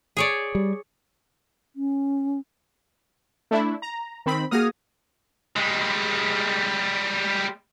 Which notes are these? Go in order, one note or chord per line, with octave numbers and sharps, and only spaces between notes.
G#4 C#5 D5
G3
C#4
A3 D4 E4
A#5
D#3 C4 B5
A#3 F#4 G#4 D#6 F6 A#6
G3 G#3